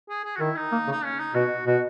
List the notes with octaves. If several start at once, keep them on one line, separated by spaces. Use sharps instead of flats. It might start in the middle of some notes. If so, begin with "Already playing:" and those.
G#4
G#4
F#4
D#3 E4
D#4
A#3
C#3
D#4
C#4
D#4
B2 F#4
B2 F#4